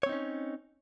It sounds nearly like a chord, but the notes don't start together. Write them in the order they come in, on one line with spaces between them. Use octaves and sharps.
C#5 C4 D#4 C#4